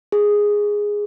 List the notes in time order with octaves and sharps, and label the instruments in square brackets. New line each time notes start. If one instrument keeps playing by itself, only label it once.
[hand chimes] G#4